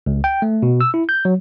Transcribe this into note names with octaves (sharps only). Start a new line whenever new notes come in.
C#2
G5
A3
B2
E6
E4
G6
F#3